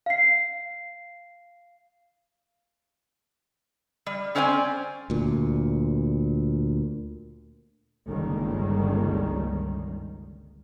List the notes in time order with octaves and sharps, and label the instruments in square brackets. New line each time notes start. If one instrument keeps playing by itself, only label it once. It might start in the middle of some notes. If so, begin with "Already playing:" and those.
[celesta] F5 C7
[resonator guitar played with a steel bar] G3
C4 C#4 C5 D5 F#5 G#5
[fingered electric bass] D2 A#2
[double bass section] G1 C#2 D#3 G3 A#3